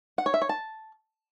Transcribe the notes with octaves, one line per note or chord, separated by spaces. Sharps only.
F#5
C#5
E5
C#5
A5